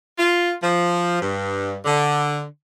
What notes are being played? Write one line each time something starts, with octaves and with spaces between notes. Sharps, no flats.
F4
F3
G2
D3